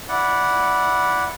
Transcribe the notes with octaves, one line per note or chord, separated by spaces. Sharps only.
E4 D5 F#5